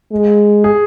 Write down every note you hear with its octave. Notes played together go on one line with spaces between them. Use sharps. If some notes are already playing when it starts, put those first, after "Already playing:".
G#3
G#4